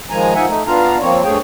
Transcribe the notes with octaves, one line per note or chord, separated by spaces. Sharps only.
D#3 F3 G#3 G#5 A#5
F3 D#4 E5 F#5 G#5
A3 D#4
B3 D4 F4 F5 A#5
F3 A#3 C4 C#5
G2 A3 G#4 C#5 G5